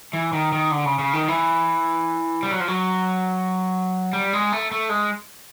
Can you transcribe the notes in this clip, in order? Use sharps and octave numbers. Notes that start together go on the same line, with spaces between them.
E3
D#3
D#3
D3
C#3
C#3
D#3
E3
G3
F#3
F3
F#3
G3
G#3
A3
A3
G#3